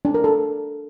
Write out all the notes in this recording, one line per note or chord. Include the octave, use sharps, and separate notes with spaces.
D4
A#4
A4